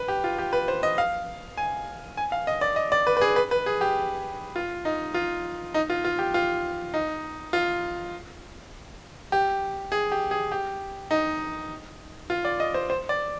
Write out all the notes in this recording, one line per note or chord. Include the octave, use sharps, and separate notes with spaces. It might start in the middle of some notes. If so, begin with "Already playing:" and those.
Already playing: B4
G4
F4
G4
B4
C5
D#5
F5
G#5
G#5
F5
D#5
D5
D#5
D5
B4
B4
G#4
B4
B4
G#4
G4
F4
D#4
F4
D#4
F4
F4
G4
F4
D#4
F4
G4
G#4
G4
G#4
G4
D#4
F4
D5
D#5
C5
C5
D5